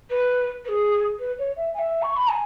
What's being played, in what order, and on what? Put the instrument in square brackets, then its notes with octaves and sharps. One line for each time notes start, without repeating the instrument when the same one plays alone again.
[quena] B4
B4
G#4
B4
C#5
E5
G#5
E5
C#6
B5
G#5